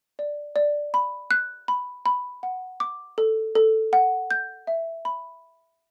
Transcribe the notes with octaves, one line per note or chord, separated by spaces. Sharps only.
D5
D5
B5
F#6
B5
B5
F#5
D6
A4
A4
F#5
G6
E5
B5